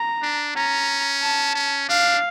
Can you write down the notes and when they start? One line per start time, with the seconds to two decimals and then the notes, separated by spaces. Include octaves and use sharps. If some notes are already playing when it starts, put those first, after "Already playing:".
Already playing: A#5
0.22 D4
0.56 C#4 A#5
1.22 A5
1.55 C#4
1.89 D4 F5